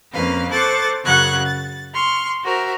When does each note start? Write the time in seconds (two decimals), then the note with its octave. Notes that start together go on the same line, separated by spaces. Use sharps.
0.12 F2 A#3 C#4 B4 F5
0.51 A4 C5 C#6 D6 F#6 A6
1.04 F#2 C#3 F#3 F#5 F#6 G#6
1.45 A6
1.93 C6 C#6 F6
2.43 F#4 A#4 C5 E5